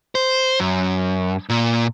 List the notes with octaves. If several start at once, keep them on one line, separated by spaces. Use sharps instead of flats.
C5
F#2
A#2